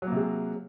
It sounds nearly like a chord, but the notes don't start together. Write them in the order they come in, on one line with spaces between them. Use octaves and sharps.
F#3 A#3 C3 G#3